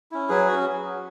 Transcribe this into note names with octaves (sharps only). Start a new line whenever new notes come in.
C#4 E4
F#3 G#4 B4
C#4 F#4